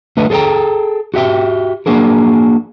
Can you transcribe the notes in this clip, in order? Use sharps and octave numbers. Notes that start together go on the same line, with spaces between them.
D3 A3 B4 D#5
G#4 A4 C#5 G5 A#5
F#4 G4 E5 G5
A#3 D4 F#4 G#4 A#4